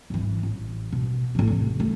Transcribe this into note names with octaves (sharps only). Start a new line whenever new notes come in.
G#1 E3
A1
B2
A1 E3
F1
A3